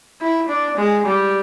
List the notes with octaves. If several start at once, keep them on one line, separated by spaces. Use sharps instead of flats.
E4
D4
G#3
G3